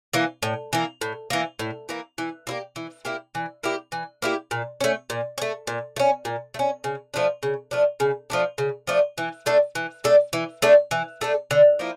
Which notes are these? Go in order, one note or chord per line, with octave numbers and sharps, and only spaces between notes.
E3 A#3
A2
E3 A#3
A2
E3 A#3
A2
E3 A#3
E3
A#3 E4 G4
E3
A#3 E4 G4
E3
A#3 E4 G4
E3
A#3 E4 G4
A#2
A3 C#4
A#2
C#4
A3
A#2
A3
C#4
A#2
A3
C#4
C#3
F3 A3 D4
C#3
F3 A3 D4
C#3
F3 A3 D4
C#3
F3 A3 D4
E3
A3 D4 A4
E3
A3 D4 A4
E3
A3 D4 A4
E3
A3 D4 A4
D3
F3 A#3 E4